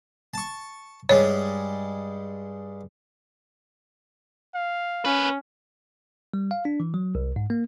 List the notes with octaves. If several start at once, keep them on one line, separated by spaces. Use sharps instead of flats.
A5 C#6
G2 G3 G#3 C#5
F5
A#3 C#4 B4
G3
F5
D4
E3
F#3
C2
G#2
A#3